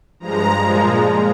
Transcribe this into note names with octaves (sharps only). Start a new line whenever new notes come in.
G2 F3 G#3 A#5
A#2 F3 G#3